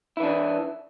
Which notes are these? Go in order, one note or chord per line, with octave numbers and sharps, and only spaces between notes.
E3 D4 E4